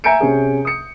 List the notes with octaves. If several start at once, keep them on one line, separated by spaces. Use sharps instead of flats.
E5 G#5 A#5 G6 C#7 D7
C3 C#4 G#4
D#6 C#7